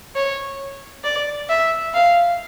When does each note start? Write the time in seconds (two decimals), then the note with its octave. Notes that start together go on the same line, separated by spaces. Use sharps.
0.15 C#5
1.04 D5
1.49 E5
1.94 F5